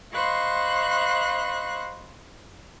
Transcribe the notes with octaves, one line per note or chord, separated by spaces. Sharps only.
C5 D#5 F5 B5 C#6 F#6